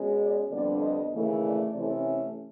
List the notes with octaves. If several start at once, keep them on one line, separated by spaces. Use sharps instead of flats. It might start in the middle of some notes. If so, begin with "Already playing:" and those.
Already playing: B2 G#3 C#4
D5
F2 D3 G3 B3 D4 D5
D#5
D#2 C#3 E3 A3
D5
C3 E3 A3 C#4